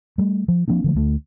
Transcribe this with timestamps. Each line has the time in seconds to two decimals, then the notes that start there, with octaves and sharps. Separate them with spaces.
0.18 G3 A3
0.48 F3
0.68 F3 A#3 C4 D4
0.84 D3 F3 A3
0.95 D2 A3